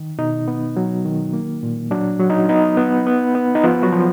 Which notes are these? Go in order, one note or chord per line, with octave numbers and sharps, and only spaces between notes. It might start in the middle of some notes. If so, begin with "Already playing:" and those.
Already playing: D#3
B2 D#4
B3
F#3
D#3
A#3
A#2
F#3 D4
F#3
D#4
B3 D#4
B3
B3
B3
D#4
F3 B3 F4
F#3 F#4
F3